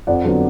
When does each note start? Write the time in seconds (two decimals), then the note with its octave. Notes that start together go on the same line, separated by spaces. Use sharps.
0.07 F2 D5 F#5
0.24 D3 F#3 B3